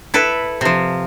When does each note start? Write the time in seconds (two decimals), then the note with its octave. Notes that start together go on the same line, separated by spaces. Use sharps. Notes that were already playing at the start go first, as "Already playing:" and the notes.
0.14 E4 A4 B4
0.61 C3 F3